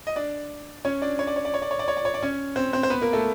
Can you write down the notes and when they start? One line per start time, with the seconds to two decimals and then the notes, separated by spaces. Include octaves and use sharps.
0.07 D#5
0.16 D4 D5
0.85 C#4 C#5
1.02 D4 D5
1.19 C#5
1.27 D5
1.36 C#5
1.45 D5
1.54 C#5
1.62 D5
1.71 C#5
1.79 D5
1.88 C#5
1.97 D5
2.05 C#5
2.14 D5
2.23 C#4 C#5
2.56 C4 C5
2.73 C4 C5
2.83 C5
2.90 B3 B4
3.01 A#3 A#4
3.13 A3 A4